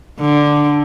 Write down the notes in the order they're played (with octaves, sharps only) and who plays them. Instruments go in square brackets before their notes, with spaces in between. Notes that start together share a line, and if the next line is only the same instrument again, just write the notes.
[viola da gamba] D3